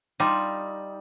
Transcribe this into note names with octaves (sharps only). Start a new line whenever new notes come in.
G3 D#4 F4